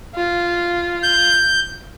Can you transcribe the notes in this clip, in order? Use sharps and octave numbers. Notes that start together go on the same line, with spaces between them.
F4
G6